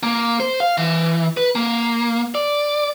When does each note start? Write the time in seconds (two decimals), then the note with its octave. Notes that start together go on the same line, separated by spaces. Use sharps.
0.03 A#3
0.40 C5
0.60 F5
0.78 E3
1.37 B4
1.55 A#3
2.35 D5